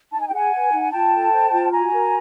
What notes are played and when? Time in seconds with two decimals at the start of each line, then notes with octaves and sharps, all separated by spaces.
0.12 D#4 A5
0.20 G#5
0.27 G5
0.32 G#4 F#5 G#5
0.53 B4
0.72 D#4
0.92 F4 G5 A5
1.12 A4
1.32 C5
1.52 F4
1.72 F#4 G#5 A#5
1.92 A#4